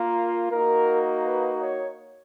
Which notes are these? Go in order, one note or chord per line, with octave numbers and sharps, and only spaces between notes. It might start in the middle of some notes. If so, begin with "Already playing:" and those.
Already playing: A#3 F4 A#4
A#3 D#4 F#4 A#4
B4
C#5